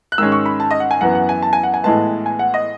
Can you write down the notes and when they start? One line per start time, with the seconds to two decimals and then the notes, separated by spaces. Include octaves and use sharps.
0.12 F#6
0.18 G#2 D#3 G#3 C#4 E6
0.32 C#6
0.46 B5
0.60 A5
0.71 D#5
0.80 F#5
0.91 G#5
1.01 F#2 E3 B3 F#5
1.15 F#5
1.29 G#5
1.42 A5
1.53 G#5
1.63 F#5
1.74 G#5
1.84 A2 E3 G#3 B3 A5
2.26 G#5
2.39 F#5
2.54 D#5